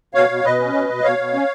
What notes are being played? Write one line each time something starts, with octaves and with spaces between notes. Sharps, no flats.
B2 C#5 F5
B2
B2 B4 D#5
C#4
B2
B2
B2 C#5 F5
B2
C#4